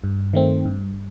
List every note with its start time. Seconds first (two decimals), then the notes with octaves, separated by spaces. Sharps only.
0.04 G2
0.33 D#3 A3 C4
0.65 G2